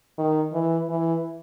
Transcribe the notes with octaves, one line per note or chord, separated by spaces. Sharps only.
D#3
E3
E3